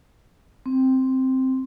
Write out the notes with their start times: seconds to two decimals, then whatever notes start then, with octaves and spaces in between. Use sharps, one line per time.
0.66 C4